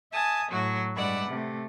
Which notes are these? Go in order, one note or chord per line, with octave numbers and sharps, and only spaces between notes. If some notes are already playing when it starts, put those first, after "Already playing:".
E5 G#5 A5 D#6
A2 F#3 F#4
G2 G#3 B4 D5 E5 F#5
C3 A3